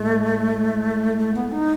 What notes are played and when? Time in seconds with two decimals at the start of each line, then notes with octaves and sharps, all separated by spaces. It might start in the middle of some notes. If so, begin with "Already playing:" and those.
Already playing: A2 G#3 A3
1.17 A3
1.35 B3
1.52 D#4